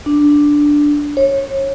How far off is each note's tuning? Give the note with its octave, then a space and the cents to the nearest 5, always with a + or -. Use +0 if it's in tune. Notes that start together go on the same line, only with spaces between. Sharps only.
D4 +0
C#5 -25